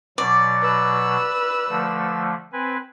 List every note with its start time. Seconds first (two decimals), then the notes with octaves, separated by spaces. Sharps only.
0.18 B2 F#3 D5
0.62 B4 E6
1.69 D3 F3 A3
2.53 C4 B4 G#5